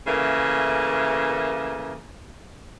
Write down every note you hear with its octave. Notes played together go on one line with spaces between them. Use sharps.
C#3 E3 A3 A#3